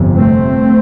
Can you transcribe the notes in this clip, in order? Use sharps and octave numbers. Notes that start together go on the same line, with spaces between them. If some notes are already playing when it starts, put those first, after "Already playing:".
Already playing: G1 F2 C3
A3 C4